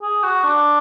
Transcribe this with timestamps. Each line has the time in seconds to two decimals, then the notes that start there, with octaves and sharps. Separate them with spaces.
0.02 G#4
0.23 F#4
0.44 D4